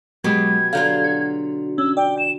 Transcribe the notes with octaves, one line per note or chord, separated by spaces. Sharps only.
B2 F#3 G#3 B3 G4 G#6
D3 F#3 F4 F5 G6
F#4
C#4 E6
D5 G5
E7